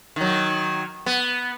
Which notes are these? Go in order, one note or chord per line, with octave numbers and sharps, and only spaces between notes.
D#3 F#3
B3